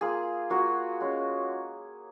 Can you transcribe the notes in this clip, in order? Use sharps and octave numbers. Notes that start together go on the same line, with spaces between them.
A#3 F4 G#4
A#3 F4 F#4
G#3 C#4 F4